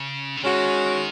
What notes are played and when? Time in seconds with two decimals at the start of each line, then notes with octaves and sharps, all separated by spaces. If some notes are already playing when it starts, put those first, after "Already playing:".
Already playing: C#3
0.37 D3
0.44 D#3 G#3 C#4 F#4